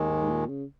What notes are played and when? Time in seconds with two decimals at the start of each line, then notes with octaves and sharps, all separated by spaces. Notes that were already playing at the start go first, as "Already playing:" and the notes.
Already playing: D#2 D#3 G#3
0.09 G#2
0.21 G#2
0.29 A#2
0.49 C#3